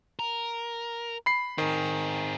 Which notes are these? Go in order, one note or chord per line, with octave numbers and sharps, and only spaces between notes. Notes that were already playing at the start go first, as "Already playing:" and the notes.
A#4
B5 C7
D#3 C4 G#4